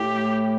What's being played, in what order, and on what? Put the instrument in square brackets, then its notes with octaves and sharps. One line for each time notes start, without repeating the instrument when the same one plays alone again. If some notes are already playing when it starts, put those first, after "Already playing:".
Already playing: [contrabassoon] A2 [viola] G4